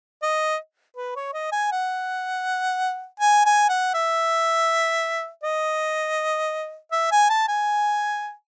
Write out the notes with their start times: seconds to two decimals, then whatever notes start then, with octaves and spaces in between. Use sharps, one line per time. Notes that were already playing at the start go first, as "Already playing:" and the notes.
0.22 D#5
0.96 B4
1.16 C#5
1.33 D#5
1.52 G#5
1.72 F#5
3.20 G#5
3.45 G#5
3.69 F#5
3.94 E5
5.43 D#5
6.92 E5
7.11 G#5
7.29 A5
7.48 G#5